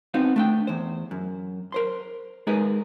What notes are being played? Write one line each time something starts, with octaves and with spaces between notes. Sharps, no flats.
B3 C4 D#4 F#4 F5
A3 D4 G5
E2 C5
F#2
A#4 C5 C6
G#3 D#4 G#4 A#4 B4 D#5